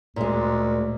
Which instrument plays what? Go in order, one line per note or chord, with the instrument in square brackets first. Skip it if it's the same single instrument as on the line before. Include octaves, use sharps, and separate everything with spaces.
[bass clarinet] D2 [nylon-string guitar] A#2 G#3